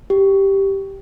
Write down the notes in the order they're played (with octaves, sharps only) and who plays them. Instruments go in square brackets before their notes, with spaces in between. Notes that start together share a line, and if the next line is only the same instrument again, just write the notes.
[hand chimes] G4